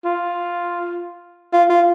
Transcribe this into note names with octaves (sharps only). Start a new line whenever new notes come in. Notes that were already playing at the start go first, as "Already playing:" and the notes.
F4
F4
F4